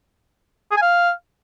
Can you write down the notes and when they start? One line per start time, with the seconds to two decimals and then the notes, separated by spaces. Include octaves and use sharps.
0.71 G#4
0.77 G#5
0.82 F5